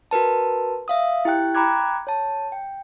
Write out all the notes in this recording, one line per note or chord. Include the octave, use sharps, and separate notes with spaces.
F#4 A#4 B4 A5
E5 F5 D#6
E4 G4 G5 F#6
G5 A#5 B5 D6 F#6 G#6
C#5 A5
G5